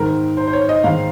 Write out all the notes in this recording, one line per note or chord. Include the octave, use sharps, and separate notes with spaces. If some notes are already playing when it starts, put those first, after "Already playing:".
Already playing: G#2 D#3 A#4
C5
C5
C#5
D#5
G#2 D#3 F5